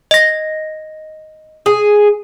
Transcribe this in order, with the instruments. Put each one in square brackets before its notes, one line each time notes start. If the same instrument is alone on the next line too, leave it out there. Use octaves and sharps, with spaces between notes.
[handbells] D#5 A#6
[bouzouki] G#4